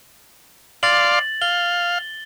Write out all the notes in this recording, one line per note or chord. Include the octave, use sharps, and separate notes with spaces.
D5 F5 C6 A6 F#7
F5 G7